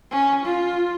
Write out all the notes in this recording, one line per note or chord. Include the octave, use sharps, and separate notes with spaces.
C#4
F4